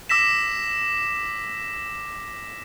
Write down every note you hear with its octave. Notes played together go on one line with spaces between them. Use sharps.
D6 E6 A#6 B6 E7